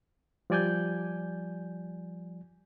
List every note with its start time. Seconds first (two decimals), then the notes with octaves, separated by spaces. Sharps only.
0.50 F3 G3 D5 G#5 G6